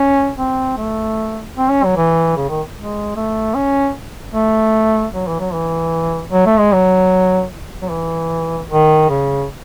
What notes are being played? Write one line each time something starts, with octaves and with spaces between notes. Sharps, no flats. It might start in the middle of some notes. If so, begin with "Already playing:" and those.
Already playing: C#4
C4
A3
C4
C#4
F#3
E3
C#3
D#3
G#3
A3
C#4
A3
F#3
E3
F#3
E3
F#3
A3
G#3
F#3
F#3
E3
D#3
C#3